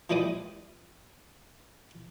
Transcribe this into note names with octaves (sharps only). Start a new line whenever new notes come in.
A#2 E3 G#3 G4 D5 D#6